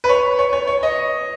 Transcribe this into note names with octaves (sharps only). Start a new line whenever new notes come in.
B4
C#5
C#5
C#5
C#5
D#5